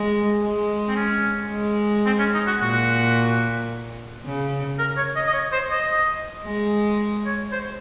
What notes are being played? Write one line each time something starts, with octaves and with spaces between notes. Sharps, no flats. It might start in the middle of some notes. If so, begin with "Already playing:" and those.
Already playing: G#3
G#3
C4
C#4
G#3
C4
C#4
D#4
F#4
A#2 F#4
C#3
A#4
C#5
D#5
D#5
C#5
C5
D#5
G#3
C#5
C5